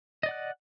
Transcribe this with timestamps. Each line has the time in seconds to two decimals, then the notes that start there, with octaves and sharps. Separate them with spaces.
0.23 D#5
0.26 D5
0.29 F#5
0.31 F#6